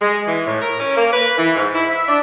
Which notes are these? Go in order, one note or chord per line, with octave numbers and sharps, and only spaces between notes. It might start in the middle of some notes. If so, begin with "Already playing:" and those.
G#3
E3
A2
A#4
C#4
A#3
B4
E3
G#2
E4
E5
D4